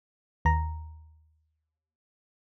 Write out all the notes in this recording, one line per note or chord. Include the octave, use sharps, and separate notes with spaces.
D#2 A#5